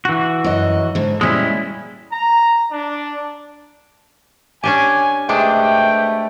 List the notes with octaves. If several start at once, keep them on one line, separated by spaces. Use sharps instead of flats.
E3 F#4
F#2 D#5
G#2 D3
A#2 G3 G#3 C#4 E4
A#5
D4
C#4 D4 G4 G#5
C3 G#3 A3 D4 G4 B4 G5